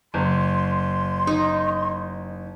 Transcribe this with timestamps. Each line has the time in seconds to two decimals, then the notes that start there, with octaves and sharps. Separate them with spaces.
0.14 F#1 C6
1.27 D#4